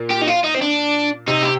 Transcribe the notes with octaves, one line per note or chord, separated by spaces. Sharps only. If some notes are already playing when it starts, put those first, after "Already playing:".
Already playing: A#2 A#3
G4
D#4
F4
D#4
C4
D4
C3 C4 D#4
G4